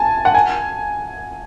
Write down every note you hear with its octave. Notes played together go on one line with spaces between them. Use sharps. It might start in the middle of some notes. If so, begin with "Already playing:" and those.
Already playing: G#5 A5
F#5
G#5